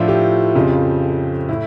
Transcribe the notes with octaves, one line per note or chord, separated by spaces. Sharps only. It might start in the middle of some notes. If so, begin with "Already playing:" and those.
Already playing: A2 F3 D4 E4 F4
G4
F2 C#3 F3
A2 E4